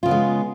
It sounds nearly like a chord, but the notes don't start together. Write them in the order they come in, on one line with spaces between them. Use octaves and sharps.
F4 C#3 B3 G#3